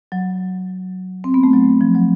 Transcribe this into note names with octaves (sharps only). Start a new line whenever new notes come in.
F#3
C4
B3
A3
F#3
F3
F#3